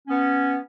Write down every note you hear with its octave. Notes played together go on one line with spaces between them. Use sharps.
B3 C#4